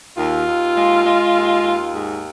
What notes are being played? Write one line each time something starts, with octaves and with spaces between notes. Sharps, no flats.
D#2 F4
D#2
G#3
G#3
D#2
D#2
G#2